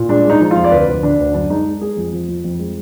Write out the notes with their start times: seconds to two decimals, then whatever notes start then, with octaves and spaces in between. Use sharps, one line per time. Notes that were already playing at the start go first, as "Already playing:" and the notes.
Already playing: A#2
0.09 G#3 D4
0.25 G#3 D#4
0.40 F3 D#4
0.51 F4
0.56 F2
0.64 D5
0.72 D2 B4
0.87 D2
1.03 D3 D4
1.19 D2
1.34 F#2 D4
1.50 G#3 D#4
1.66 G#3
1.81 G#3 G#4
1.97 F2
2.13 F3
2.29 F2
2.44 F2
2.59 G#3